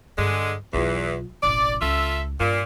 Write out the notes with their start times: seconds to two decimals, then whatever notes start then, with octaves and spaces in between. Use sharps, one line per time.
0.18 G2 D3 G#3
0.73 B1 E2 F4
1.43 E1 A1 D5
1.82 C#2 F4 A4 E5
2.40 G2 A#2